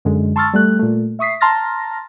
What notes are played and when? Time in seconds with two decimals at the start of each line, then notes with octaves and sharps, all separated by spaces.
0.05 F#2 D3 G#3
0.36 A5 C6 C#6 E6 F6 A6
0.53 G3 A3 F#6
0.79 A#2 A3
1.19 E5 C#6 D#6 B6 C7
1.41 A5 A#5 C6 F6 A6 A#6